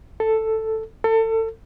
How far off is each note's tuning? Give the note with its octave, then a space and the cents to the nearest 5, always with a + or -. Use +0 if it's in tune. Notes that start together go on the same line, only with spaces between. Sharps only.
A4 +5
A4 +30